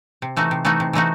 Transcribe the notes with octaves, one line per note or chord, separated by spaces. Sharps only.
C3
E3 A3 D#4 F#4
C3
E3 A3 D#4 F#4
C3
E3 A3 D#4 F#4